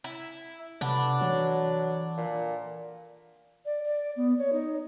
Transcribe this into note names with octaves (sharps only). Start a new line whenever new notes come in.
E4
C3 D4 A4 B4 F#5
E3 F#3
A#2
D5
D5
B3
C#5
D#4